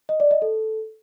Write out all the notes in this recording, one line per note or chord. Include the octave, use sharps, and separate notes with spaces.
D#5
D5
D#5
A4